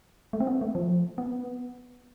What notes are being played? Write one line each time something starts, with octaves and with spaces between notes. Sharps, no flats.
A3
C4
B3
A3
F3
B3